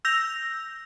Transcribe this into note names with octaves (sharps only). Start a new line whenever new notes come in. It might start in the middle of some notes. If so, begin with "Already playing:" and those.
E6 G6 A#6 F7